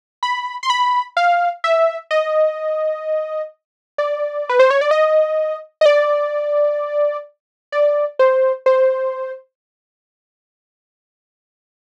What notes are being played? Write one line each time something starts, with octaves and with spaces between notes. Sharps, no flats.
B5
C6
B5
F5
E5
D#5
D5
B4
C5
C#5
D5
D#5
D#5
D5
D5
C5
C5